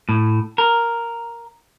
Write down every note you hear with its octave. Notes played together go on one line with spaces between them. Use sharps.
A2
A#4